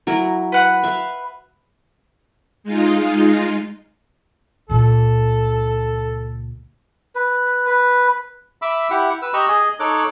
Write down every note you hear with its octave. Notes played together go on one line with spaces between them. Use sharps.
F#3 E4 A#4
B4 F#5
E5 F5
G#3 D#4 F4
C#2 A#2 A4
B4
B4
E5 B5 D6 E6
E4 G4 F#5
B4 E6
G4 D#5 A#5 C#6 E6 F#6
G#4 D#5 G#5
D#4 A4 C#5 D6 F#6